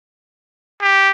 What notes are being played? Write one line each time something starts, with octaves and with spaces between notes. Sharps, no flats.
G4